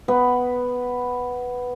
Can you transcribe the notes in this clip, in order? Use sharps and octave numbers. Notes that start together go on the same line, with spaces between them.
B3 B4